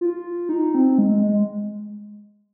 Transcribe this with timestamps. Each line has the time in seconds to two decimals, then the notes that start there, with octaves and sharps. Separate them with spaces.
0.01 F4
0.49 D#4
0.75 C4
0.98 G#3
1.11 G#3
1.23 G#3